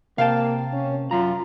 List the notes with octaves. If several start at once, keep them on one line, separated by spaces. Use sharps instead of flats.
C3 A#3 F5 G5 A5
C#4
F#2 F4 A#5